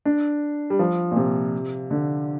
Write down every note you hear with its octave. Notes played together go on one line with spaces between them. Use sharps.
D4
G3
F3
A#2
C3
D3